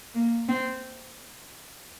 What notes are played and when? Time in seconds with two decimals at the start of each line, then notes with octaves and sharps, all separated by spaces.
0.15 A#3
0.49 C4